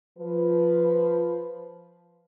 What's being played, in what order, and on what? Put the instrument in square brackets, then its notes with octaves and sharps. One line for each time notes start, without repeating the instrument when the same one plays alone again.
[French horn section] F3 B4